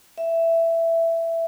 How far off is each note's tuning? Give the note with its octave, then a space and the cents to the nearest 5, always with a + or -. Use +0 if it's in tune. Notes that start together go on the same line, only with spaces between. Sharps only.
E5 +10